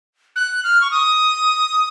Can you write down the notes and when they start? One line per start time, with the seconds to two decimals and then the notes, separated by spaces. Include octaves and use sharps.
0.36 F#6
0.64 F6
0.81 C#6
0.91 D#6